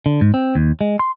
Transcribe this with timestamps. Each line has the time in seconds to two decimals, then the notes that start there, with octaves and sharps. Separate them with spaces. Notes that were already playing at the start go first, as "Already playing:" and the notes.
0.06 D3
0.21 G#2
0.34 C4
0.55 D#2
0.81 G#3
0.99 C6